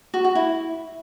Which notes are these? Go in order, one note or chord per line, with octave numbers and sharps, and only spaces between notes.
F#4
F#4
E4